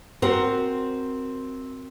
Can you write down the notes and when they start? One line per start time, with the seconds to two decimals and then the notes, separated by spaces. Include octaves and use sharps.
0.22 C4 F#4 G4 A#4 C5